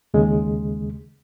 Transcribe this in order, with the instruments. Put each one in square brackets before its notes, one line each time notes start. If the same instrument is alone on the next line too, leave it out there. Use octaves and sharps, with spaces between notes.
[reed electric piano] D#2 C#3 G#3